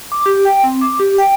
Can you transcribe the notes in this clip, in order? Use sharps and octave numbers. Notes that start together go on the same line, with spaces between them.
D6
G4
G5
C4
D6
G4
G5